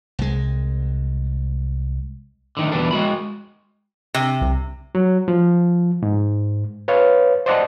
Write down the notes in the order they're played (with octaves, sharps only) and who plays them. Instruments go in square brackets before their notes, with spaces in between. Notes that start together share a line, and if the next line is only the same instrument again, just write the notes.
[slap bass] C2 G#3
[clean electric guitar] D3 D#3 A3
E2 B2 E3 G3 D4
G#3 F#4 B5
[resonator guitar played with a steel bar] C3
[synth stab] C2
[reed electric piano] F#3
F3
G#2
B4 C#5 F5
C5 D5 D#5 F#5 A5 C6